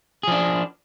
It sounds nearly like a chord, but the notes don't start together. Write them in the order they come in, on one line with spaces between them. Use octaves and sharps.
G#4 F3 D4